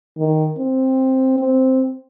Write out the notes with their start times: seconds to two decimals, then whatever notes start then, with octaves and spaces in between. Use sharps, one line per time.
0.18 D#3
0.58 C4
1.39 C4